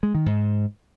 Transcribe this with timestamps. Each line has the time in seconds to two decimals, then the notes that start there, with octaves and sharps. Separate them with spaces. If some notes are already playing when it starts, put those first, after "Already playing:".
0.03 G#3
0.15 D#3
0.26 G#2